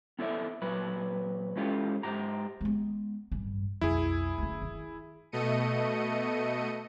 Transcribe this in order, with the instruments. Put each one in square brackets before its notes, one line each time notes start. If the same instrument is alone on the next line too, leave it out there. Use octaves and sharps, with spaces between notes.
[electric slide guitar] B3 E4 A4 A#4 D5 E5
A#2 F#3 B4
G#3 C#4 E4 F4 G4 A4
G#2 G4 A#5
[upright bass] G#3 B3
A1 G2
[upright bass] B1 F2 [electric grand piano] E4 G#4
[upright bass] D2 C#4
D#3
[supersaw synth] B2 A3 D#5 C#7 D#7